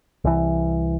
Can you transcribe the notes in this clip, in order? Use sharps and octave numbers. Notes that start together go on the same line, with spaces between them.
C2 E3